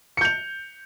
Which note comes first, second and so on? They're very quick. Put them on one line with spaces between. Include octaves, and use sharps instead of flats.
C#7 G6 F7